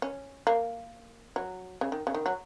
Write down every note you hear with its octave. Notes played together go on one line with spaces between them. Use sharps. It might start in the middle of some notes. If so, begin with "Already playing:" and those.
C#4
A#3
F#3
C#3
D#3
C#3
D#3
F#3